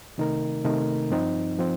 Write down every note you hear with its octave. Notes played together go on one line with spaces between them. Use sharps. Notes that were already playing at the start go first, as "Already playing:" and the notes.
C3 D#3 A3 D#4 A#4
C3 D#3 A3 D#4 A#4
G2 F3 C4 D#4
F3 C4